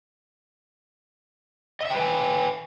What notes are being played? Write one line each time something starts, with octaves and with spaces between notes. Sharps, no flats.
B4 D#5 E5 G5 G#5